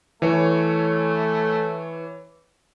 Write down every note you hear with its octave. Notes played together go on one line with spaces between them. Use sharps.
E3 A3 C#5